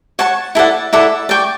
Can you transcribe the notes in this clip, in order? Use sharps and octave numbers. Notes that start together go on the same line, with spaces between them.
C#5 F#5 A5 C#6
E4 A4 D5 F#5
E4 A4 D5 F#5
D5 G5 C#6